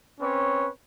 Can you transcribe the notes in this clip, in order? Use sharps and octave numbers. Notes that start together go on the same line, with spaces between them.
C4 C#4 B4 C#5